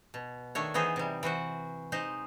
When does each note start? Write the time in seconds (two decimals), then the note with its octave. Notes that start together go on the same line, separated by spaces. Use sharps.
0.14 B2
0.55 D#3 A3 D4 C#5
0.74 E3 B3 D#4 G#4 C5
0.96 C3 G3
1.23 E3 F#4 C5 F#5
1.92 G#3 D#4 C5